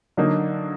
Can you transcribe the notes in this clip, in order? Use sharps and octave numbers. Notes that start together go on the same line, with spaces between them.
D3 F#3 A#3 D#4